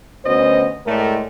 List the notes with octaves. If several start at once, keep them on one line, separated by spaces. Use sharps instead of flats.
D2 B3 C#4 F#4 C5 D#5
A2 G#3 A3 A4 A#4 D5